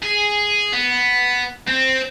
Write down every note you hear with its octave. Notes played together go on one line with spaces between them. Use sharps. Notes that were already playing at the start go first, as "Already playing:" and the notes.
G#4
B3
C4